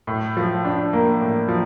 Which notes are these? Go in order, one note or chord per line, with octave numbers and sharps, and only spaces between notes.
A2
F3
D4
A#3
A2
F3